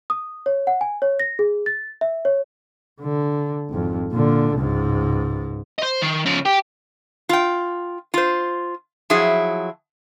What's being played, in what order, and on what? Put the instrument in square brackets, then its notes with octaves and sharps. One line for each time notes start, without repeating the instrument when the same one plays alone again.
[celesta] D#6
C#5
F#5
G#5
C#5
A#6
G#4
A6
E5
C#5
[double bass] D3
G#1 F2
A#2 D3
C#2 G#2
[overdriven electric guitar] C5 D#5
D#3
C#3 F3
G4 G5
[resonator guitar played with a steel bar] F4 G5
F4 C5
F3 F#3 E4 G#4